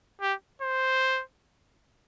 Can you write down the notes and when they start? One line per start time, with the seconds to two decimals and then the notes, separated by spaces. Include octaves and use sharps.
0.21 G4
0.62 C5